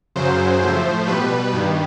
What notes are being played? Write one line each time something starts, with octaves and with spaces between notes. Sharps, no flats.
F#2 C#3 F#3 C5
A2 F3 A3 C5
B2 G3 B4
G2 D#3 G3